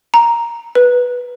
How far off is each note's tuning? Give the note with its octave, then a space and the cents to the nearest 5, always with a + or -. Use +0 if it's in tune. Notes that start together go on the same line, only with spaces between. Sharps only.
A#5 +5
B4 -5